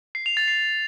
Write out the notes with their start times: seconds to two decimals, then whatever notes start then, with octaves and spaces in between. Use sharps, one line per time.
0.15 C7
0.26 F7
0.37 A6
0.48 C7